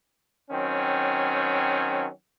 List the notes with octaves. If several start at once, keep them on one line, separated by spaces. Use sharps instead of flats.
D#3 F#3 C4 C#4